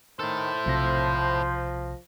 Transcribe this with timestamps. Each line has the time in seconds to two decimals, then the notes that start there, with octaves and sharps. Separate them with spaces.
0.19 D#3 E4 A4 C5
0.66 B1 C3 F3 A#6